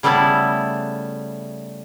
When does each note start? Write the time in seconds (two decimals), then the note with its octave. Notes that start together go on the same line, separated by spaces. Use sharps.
0.03 C#3 G3 A3 B3 E4 A4